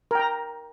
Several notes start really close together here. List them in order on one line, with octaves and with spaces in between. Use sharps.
A#4 G5 A#5